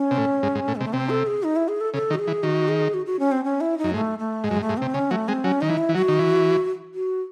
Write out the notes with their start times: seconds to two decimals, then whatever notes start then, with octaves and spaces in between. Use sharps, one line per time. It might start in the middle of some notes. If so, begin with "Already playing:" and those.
Already playing: C#4
0.11 C3
0.18 A2
0.43 G#2
0.55 G#2
0.68 A2
0.76 G#3
0.81 C3
0.85 A3
0.93 C3 C4
1.09 A4
1.27 G#4
1.43 D#4
1.56 E4
1.68 G#4
1.81 A4
1.94 C#3 A4
2.10 D#3
2.14 F#4
2.19 G#4
2.27 E3
2.43 D#3 F#4
2.68 G#4
2.94 F#4
3.06 F#4
3.19 C#4
3.32 C4
3.44 C#4
3.61 E4
3.78 D#4
3.84 F#2
3.94 G#2 A3
4.19 A3
4.44 G#2 G#3
4.51 F#2
4.56 G#2
4.61 A3
4.69 G#2
4.77 C3 C4
4.94 C#3 C#4
5.11 F#3 A3
5.28 G#3 C4
5.44 F#3 C#4
5.61 D#3 D#4
5.69 E3
5.78 E4
5.89 E3
5.95 F#3 F#4
6.08 D#3
6.19 E3
6.95 F#4